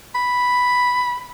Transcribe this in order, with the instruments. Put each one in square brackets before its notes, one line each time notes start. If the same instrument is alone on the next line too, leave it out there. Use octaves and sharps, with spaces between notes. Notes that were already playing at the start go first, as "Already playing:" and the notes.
[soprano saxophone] B5